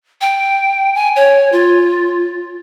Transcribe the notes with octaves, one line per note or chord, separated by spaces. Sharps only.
G5
G#5
C#5
F4